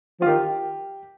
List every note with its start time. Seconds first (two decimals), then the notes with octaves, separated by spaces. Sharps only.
0.20 F3 F4
0.26 D#3 G4